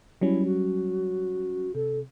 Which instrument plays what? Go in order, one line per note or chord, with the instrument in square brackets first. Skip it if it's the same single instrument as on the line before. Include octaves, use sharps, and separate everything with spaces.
[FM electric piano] F#3 G3 C#4 [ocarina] E4
[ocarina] F#4
[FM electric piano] C3 [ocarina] A4